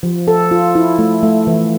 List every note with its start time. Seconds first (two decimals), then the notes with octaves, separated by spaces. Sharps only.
0.03 F3
0.28 A4
0.51 F4
0.75 E4
0.99 A3
1.23 A3
1.47 E3